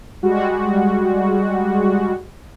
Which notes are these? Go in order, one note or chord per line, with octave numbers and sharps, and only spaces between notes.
G3 G#3 F#4